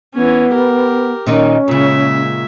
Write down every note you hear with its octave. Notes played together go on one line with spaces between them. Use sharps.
E3 B3 C#4
G4 A#4
A#2 D#3 C#4 D#4
A#2 C#3 G#3 E5